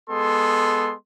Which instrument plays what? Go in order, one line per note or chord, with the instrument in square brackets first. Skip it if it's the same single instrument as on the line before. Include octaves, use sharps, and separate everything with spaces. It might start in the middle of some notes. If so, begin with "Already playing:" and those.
[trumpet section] G#3 B3 A4 C6